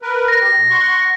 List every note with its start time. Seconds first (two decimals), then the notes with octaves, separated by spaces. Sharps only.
0.02 A#4 B4
0.28 A#6
0.41 G4
0.56 B2
0.70 F#5 C6 C#6